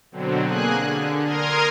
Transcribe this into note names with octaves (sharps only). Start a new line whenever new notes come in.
B2 D3 F#3 C4
A#3 G#4 G#5 F#6
D3
A#4 A#5 C6 D#6 F6 G#6